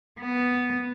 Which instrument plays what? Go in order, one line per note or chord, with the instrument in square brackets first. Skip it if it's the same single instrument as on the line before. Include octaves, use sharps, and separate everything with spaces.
[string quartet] B3